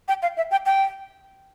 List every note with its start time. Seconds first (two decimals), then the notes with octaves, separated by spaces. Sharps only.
0.08 G5
0.22 F5
0.37 E5
0.51 G5
0.66 G5